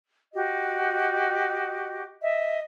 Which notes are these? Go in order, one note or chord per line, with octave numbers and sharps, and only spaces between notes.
F#4 G4 D#5
D#5 E5